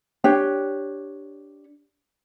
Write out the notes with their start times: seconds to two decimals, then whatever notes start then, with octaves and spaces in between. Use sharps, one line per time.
0.24 D4 G4 C#5 G5